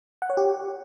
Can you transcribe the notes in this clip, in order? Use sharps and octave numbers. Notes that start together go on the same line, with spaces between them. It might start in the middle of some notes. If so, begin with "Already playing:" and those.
F#5
C#5
G4